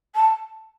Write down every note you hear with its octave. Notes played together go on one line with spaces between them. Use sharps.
A5